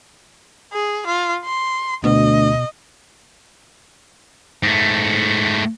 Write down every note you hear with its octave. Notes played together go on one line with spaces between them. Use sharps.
G#4
F4
C6
D2 B2 D#5
G#2 A3